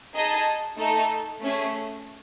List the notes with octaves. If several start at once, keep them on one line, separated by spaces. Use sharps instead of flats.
D#4 G#4 D#5 A5
A3 D#4 A4
A3 C#4 G#4